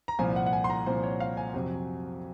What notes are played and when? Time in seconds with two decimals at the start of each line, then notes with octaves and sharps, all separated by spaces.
0.08 A#5
0.19 C2 A#2 F3 C4 G#5
0.36 F#5
0.46 F#5
0.53 G#5
0.64 C6
0.70 A#5
0.86 C2 A#2 F3 C4 C5
1.04 C#5
1.20 F5
1.37 G#5
1.54 F2 C3 F#3 C4